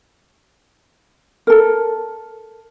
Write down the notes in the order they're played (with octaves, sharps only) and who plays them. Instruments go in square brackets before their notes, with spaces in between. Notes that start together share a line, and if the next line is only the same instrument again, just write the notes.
[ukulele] A4 A#4